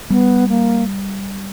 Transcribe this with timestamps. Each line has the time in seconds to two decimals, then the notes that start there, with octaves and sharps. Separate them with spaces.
0.10 G3 B3
0.49 A#3